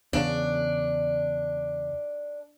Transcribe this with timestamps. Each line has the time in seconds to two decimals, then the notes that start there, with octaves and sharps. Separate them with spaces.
0.13 E2 C#3 D4